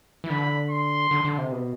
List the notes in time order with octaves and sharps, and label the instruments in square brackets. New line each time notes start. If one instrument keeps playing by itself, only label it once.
[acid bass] E3
[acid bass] D3 [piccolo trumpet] B5
[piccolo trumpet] C6
[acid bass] D3
D3
C3
B2